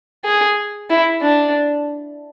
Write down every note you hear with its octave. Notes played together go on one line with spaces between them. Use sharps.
G#4
E4
D4